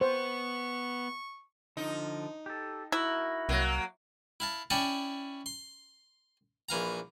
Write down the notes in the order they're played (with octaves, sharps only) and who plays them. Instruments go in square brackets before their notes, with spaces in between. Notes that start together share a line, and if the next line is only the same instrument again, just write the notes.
[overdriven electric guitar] B3 [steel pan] C5 [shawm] C#6
[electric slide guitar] D3 F3 [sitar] D#4
[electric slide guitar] G4 A4
[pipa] E4 [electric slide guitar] F#4 A#4
[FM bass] C2 [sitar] F#3 A#3
[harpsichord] E4 F5 A5
C#4 E4 D5 G5 A5 C#6
C6
A#1 E3 F5 A#5